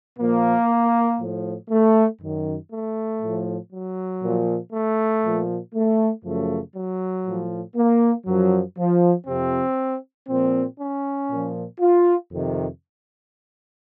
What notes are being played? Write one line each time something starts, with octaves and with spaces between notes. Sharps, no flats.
A#2 F3 A#3
A2 F3
A3
F#2 D#3
A3
A2 F3
F#3
A#2 F3
A3
A#2 F3
A3
F#2 C#3 F3 A3
F#3
A2 F3
A#3
F#2 F3 F#3
F3
F2 C3 F3 C4
A#2 F3 C4
C#4
A#2 F3
F4
F2 C3 D#3